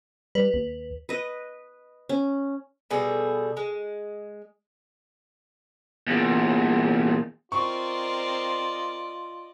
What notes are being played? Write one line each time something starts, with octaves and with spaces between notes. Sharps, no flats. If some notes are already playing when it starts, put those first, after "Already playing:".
G3 B4
D#2
B4 D#5
C#4
B2 G3 G#4 A4
G#3
E2 A#2
C4 F4 A#4 D5 D#5 C#6